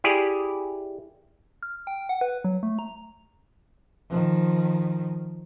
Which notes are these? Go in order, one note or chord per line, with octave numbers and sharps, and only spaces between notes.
E4 G4 G#4 D5
F6
G5
F#5
B4
F#3
A3
A#5
D#3 F3